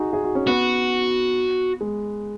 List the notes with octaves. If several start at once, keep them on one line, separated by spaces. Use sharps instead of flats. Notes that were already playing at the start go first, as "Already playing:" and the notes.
Already playing: D#4 F#4 G#4
G#4
F#4
C#4
B3 F#4
G#3